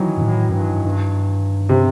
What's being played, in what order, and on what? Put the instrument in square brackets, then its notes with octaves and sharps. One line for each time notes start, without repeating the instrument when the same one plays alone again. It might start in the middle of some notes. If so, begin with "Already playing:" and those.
Already playing: [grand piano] D#3 E3 F#3
[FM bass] G2
A2
F#2
G2
G2
[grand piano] C3